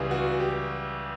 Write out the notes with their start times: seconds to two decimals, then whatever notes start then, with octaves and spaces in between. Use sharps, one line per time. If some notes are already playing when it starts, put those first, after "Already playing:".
Already playing: C#2 C#3 E3 G3
0.11 F#4
0.40 G4